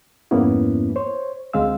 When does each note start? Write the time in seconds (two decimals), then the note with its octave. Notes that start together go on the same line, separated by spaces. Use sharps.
0.31 F2 G#2 A#3 B3 C#4 E4
0.96 C5 C#5
1.53 D2 G#3 C4 F5 E6